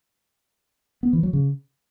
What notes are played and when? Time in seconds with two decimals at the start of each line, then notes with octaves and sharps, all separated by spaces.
1.03 B3
1.13 E3
1.23 F#3
1.33 C#3